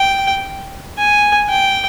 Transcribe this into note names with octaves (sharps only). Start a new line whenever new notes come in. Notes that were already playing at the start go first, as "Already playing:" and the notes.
Already playing: G5
G#5
G5